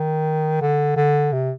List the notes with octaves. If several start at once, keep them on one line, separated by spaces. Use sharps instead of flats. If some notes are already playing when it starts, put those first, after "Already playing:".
Already playing: D#3
D3
D3
C3